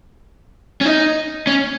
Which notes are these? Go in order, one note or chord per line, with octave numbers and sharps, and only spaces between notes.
C#4
D#4
C#4